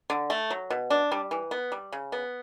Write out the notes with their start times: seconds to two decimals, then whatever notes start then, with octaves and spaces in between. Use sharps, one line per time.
0.10 D3
0.30 A3
0.50 F#3
0.70 B2
0.90 D4
1.12 G3
1.31 E3
1.51 B3
1.72 G3
1.92 C#3
2.12 B3